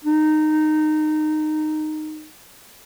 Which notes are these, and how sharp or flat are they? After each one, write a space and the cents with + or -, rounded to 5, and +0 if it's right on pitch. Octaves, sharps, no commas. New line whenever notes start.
D#4 -15